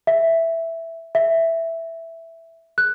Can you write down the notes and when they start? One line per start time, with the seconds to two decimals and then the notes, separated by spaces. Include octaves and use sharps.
0.07 E5
1.15 E5
2.78 F#6